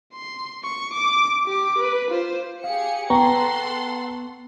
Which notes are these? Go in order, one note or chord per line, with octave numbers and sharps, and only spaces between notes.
C6
C#6
D6
G4 D6
B4
F4 C5
G4 G#4 F5 C#7
B3 A4 F#5 G5 A#5 C6 C#6